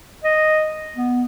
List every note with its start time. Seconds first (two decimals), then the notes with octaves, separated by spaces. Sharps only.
0.24 D#5
0.96 B3